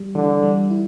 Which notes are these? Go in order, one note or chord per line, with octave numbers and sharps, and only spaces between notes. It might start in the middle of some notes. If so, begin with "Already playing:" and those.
Already playing: G3
D3 E3
G3
E4